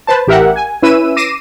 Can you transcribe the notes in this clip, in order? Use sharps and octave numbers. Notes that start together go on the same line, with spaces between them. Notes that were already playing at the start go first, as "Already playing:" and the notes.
B4 C5 A5
A1 G4 A#4 E5 F#5
G#5
C#4 E4 B4 E6 D#7
D6 A#6 C7 D#7 E7